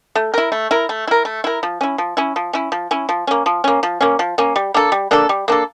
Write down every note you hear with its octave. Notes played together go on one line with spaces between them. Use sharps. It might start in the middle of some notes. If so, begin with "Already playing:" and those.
A3
E4 A#4
A3
E4 A#4
A3
E4 A#4
A3
E4 A#4
F3
C#4 E4
F3
C#4 E4
F3
C#4 E4
F3
C#4 E4
F3
A#3 C#4
F3
A#3 C#4
F3
A#3 C#4
F3
A#3 C#4
G3
A#3 D4 A4
G3
A#3 D4 A4
G3
A#3 D4 A4